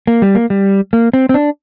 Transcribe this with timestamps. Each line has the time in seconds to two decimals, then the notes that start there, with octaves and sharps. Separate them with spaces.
0.07 A#3
0.22 G3
0.35 A#3
0.50 G3
0.93 A#3
1.13 C4
1.29 C4
1.34 D4